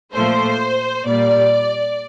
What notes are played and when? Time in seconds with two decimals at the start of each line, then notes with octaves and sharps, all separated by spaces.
0.13 A#2 F3 A3 C5
1.06 A#2 G3 D5